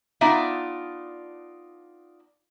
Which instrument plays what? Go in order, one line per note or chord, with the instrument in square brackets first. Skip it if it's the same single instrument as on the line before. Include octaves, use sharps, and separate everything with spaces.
[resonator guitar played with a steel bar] B3 D4 D#4 F4 D5 E5